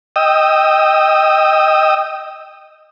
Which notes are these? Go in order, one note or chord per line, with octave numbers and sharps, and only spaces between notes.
D#5 G5 D#6 E6